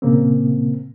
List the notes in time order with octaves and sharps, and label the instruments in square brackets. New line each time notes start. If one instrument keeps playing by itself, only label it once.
[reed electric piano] A#2 C#3 A#3 C4